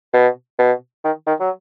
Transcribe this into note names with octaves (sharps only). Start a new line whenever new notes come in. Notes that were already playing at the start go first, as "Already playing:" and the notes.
B2
B2
D#3
D#3
F#3